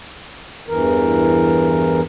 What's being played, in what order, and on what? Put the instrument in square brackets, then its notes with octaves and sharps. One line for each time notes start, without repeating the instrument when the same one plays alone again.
[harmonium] E2 G2 E3 A#4